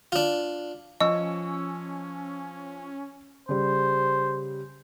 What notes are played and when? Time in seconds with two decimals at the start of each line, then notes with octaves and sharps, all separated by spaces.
0.12 D4 F4
1.01 F3 C#4 D#5 C#6 E6
3.49 C#3 G3 C5